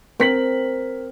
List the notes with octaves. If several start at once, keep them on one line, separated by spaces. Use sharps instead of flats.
C4 A#4 B6 F#7